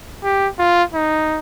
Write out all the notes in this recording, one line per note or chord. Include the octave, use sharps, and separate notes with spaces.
G4
F4
D#4